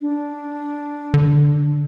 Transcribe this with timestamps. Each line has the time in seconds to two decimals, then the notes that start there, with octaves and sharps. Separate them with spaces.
0.01 D4
1.14 D3